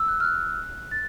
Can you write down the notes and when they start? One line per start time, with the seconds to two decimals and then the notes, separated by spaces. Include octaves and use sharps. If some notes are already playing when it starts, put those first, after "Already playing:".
Already playing: E6
0.08 F#6
0.20 F6
0.25 F#6
0.91 A6